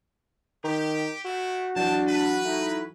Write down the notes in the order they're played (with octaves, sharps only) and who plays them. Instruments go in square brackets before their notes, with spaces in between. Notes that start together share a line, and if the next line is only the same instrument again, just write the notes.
[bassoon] D#3 [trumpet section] G4
[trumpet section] A3 E4 [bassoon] F#4
[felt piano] E3 F#3 [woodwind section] D4 [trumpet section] G5 A5
[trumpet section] B4
[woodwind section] A3 D#4 E4